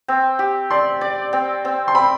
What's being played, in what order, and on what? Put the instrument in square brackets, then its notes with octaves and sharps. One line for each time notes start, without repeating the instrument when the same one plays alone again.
[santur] C4
G4
[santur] D5 [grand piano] C6
[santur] D5
C4
C4
[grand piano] C6
[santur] C4 [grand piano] B5